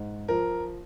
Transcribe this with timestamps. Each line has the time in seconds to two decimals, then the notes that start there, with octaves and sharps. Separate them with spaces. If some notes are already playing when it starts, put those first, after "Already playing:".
Already playing: G#2
0.28 F3 A#4